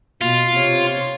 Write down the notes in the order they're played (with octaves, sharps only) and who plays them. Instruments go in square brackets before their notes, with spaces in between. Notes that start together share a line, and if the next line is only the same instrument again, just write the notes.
[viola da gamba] B2 [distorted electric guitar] F4
[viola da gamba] C3 C4 C#5